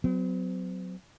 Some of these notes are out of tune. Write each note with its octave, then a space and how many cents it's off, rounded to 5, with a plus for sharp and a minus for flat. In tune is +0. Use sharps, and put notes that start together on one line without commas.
F#3 +0 C4 -45